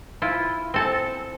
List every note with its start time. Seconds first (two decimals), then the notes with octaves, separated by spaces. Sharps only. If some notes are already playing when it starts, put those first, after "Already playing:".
0.22 E4 F4
0.74 C4 A4 A5